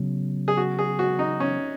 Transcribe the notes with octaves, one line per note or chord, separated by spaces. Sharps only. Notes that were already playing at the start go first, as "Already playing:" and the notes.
Already playing: C#3 F#3 B3
G#4
F#4
G#4
F#4
D#4
C#4